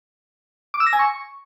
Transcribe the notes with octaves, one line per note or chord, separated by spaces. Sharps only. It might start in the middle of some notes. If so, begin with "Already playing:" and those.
D6
E6
A#6
G#5
C#6